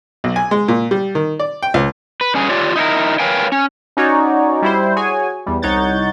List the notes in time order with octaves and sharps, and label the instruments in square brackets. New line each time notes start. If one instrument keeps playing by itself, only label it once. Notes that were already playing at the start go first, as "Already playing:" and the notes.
[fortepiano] B1
G#5
G#3
A#2
G3
D#3
D5
G5
C#2
[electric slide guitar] B4
G2 C#4 G#4
F4 G4 C#5 D5
D#4 E4 A4 A#4
A#4 B4 C#5 F5 G5 G#5
C#4
[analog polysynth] C#4 D#4 F#4 C#5 D5
G3 E4 C5
F#4 G#4 C#5 G#5
E2 G3
C2 D#4 C#5 F#5 G6 A6